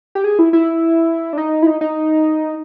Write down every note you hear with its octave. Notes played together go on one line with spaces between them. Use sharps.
G4
G#4
E4
E4
D4
D#4
E4
D#4
D#4